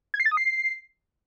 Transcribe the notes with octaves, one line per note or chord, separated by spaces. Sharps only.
G#6
C7
A6
D#6
C7